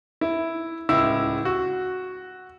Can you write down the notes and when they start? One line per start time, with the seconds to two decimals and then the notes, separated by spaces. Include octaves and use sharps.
0.21 E4
0.89 D1 C#2 E4 E6
1.45 F#4